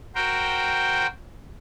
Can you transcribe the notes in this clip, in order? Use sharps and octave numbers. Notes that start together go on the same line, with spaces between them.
F#4 A#4 C5 G5